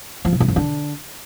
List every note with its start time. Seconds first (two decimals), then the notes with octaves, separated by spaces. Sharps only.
0.25 F3
0.33 B2
0.40 F#2
0.48 F2
0.56 D3